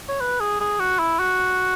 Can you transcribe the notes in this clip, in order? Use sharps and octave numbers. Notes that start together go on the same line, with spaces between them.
C#5
B4
G#4
G#4
F#4
E4
F#4